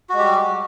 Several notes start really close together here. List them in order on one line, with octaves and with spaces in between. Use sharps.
F#4 G#3 G4 G3